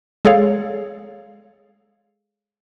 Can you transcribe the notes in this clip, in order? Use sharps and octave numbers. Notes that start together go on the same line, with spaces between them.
G#3 G#4 A4 C#5 F5